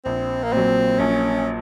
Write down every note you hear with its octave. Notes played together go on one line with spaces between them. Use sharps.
A#1 C4
A#3
A#2 F#3 C4
A#1 C#4